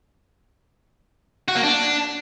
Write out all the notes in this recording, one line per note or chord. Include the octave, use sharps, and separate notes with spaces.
F#4
A#3
D4